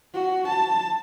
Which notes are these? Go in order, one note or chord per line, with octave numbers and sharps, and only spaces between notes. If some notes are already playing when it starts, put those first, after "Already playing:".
F#4
A5